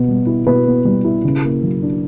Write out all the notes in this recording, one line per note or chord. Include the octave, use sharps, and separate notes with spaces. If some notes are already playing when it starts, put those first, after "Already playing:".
Already playing: B2 B3
G3
E4
B2 B4
B3
G3
E4
C#3
A#3
F#3
D4